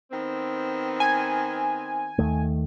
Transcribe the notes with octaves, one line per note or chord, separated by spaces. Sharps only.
D#3 B3 C4
G#5
D#2 D#3 A3